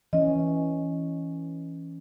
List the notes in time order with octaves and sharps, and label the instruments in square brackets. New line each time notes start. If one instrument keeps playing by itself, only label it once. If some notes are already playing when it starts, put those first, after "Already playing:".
[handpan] E3 C#4 [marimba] D#5